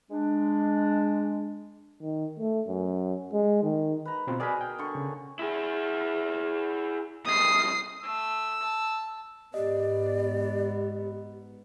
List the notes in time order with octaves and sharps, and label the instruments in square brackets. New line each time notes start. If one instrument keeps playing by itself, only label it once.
[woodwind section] G#3 D4
[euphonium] D#3
A3
F#2
G#3
D#3
[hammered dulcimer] B4 A#5
[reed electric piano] B2 C4 F4
[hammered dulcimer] B2 G#4 A#4 [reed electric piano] D5 B5
[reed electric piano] G5
[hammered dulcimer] D3 C#6
[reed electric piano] C#3
[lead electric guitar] E4 G#4
[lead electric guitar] C2 B2 [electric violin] D#6 C7
[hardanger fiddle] A3 [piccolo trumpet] E6
[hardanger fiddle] A5
[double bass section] G#2 B3 [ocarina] G4 [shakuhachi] D5 [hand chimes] D#5